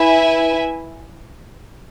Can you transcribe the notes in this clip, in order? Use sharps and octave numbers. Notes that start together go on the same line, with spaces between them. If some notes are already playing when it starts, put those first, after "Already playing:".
Already playing: E4 B4 E5 G#5